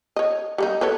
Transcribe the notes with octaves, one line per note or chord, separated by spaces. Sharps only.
C#5 D#5
G3 A#3 D#4
A4 B4 C#5